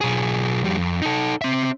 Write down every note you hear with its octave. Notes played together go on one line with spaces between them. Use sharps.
B1 G#4
F2 G3
F2
D#4 A4
C4 E5